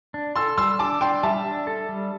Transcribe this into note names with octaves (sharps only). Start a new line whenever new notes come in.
D4
A4 C6 E6
G3 C6 E6
D4 A5 D6
D4 G5 C6
G3 E5 A5
D4
A4
G3